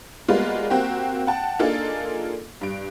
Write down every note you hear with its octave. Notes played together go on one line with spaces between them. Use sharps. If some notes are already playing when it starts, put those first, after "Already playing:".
G3 G#3 A#3 B3 F4 F#4
A#3 C4 F#4 G4
F#5 G5 A5
A#3 D4 D#4 F4 G#4 A4
G2 D7